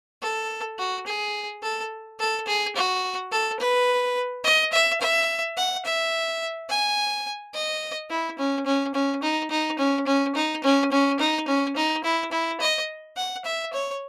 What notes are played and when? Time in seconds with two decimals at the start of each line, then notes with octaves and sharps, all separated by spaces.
0.22 A4
0.78 F#4
1.06 G#4
1.62 A4
2.19 A4
2.47 G#4
2.76 F#4
3.32 A4
3.59 B4
4.44 D#5
4.72 E5
5.00 E5
5.57 F#5
5.85 E5
6.69 G#5
7.54 D#5
8.10 E4
8.38 C#4
8.66 C#4
8.94 C#4
9.23 D#4
9.51 D#4
9.79 C#4
10.07 C#4
10.35 D#4
10.64 C#4
10.92 C#4
11.19 D#4
11.48 C#4
11.76 D#4
12.03 E4
12.31 E4
12.60 D#5
13.16 F#5
13.45 E5
13.73 C#5